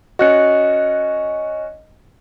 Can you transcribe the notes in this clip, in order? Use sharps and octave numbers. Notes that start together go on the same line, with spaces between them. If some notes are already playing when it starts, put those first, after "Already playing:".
C#4 F#4 D#5 F#6 C#7